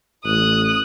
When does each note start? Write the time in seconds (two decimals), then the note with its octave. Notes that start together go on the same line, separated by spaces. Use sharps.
0.25 A1 D#6 F#6